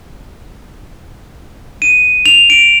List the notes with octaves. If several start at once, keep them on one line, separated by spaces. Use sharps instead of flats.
D#7
F7
D7